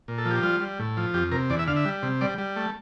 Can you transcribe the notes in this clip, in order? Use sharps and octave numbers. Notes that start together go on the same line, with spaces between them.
A#2
A4
F3
G4
G3 F4
G3
A2
F3
F2 G4
C3 A#4
E2 D5
E5
D3 F5
E5
G3
C3
G3 D5
G3
A3